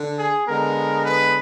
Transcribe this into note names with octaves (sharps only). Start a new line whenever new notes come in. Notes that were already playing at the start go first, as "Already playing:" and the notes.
Already playing: D3
G#4
D3 G#3 B3 A#4
B4